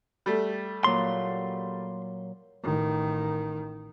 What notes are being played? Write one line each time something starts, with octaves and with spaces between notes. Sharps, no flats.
G3 A3
A#2 F#3 C6
A1 D#3